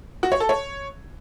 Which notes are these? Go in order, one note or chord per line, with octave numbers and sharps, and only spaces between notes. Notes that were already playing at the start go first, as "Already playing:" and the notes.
F#4
C#5
A4
C#5